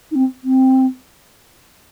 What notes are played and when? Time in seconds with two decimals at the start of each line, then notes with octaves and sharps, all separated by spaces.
0.11 D#4
0.15 C4
0.44 C4